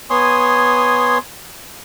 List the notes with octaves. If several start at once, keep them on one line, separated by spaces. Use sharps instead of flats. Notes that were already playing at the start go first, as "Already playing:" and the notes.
B3 C#5 G#5 C6 D#6